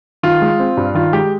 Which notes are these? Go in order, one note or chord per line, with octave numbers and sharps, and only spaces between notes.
D#3 F4
G#3
C4
G2
D#3 F4
G#3 G4